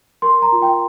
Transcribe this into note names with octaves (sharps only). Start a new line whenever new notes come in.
A#4 C6
A#5
F4
G5